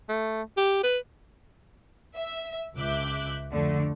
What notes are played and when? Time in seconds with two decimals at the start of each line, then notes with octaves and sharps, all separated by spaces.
0.09 A3
0.57 G4
0.83 B4
2.15 E5
2.76 C#2 E5 D6 F#6 G6
3.52 F2 D3 A3